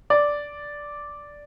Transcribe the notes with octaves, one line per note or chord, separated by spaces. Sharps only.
D5